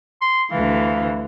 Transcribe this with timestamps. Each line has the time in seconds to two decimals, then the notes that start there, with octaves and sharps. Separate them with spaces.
0.21 C6
0.51 D2 E3 F5